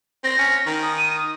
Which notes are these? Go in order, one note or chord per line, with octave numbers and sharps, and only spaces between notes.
C4 A#6
C#4
D#3
D#6
D#7
D#6